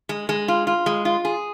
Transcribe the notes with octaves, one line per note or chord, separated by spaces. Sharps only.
G#3
G#3
F4
F4
G#3
F4
G#4